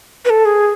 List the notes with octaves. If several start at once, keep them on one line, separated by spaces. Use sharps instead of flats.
B4
A4
G#4